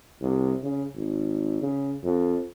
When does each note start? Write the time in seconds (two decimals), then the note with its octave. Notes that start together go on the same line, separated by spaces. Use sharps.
0.21 C2
0.63 C#3
0.96 G#1
1.62 C#3
2.04 F2